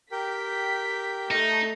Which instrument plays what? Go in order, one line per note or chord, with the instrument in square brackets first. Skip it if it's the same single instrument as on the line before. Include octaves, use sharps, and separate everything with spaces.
[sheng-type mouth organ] G4 A#4 G5 [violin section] B6
[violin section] A3 [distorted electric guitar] D#4